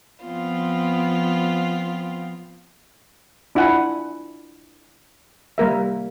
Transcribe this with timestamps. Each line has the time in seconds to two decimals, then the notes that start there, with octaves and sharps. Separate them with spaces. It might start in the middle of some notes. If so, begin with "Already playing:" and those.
0.24 F3 B3 C4 F4
3.55 D4 E4 F4 F#5 G#5
5.58 G3 A#3 A#4 E5